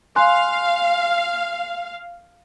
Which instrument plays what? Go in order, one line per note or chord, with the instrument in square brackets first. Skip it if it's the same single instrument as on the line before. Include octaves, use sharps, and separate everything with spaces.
[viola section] F5 [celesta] G#5 C6 F#6